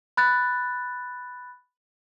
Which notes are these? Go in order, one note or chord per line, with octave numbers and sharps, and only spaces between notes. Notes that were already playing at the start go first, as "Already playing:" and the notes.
B5 F#6 A6